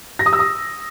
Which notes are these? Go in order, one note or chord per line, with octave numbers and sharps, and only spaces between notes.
A#6
D#6
E6
D#6